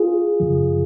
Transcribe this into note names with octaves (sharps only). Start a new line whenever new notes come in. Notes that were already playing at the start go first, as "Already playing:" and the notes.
Already playing: F4 G#4
F#2 C#3 F3